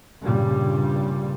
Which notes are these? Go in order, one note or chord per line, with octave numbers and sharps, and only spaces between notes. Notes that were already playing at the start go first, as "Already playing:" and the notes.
G2 A#2 C#3 G3